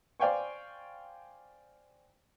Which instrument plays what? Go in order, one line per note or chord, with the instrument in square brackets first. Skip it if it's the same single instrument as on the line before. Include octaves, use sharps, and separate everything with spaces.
[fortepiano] C5 D5 F5 G5 G#5 C#6